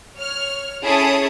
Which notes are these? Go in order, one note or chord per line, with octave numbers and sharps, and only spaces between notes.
C#5 F6
C#4 E4 G#4 A4 C#5 D#6